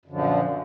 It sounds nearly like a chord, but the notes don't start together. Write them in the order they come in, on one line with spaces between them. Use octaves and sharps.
F#2 D3 F3 A#2